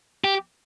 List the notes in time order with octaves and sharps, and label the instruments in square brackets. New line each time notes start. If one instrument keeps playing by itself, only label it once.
[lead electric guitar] G4